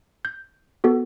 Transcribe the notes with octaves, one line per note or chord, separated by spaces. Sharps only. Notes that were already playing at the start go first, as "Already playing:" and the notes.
G6
B3 F#4 A4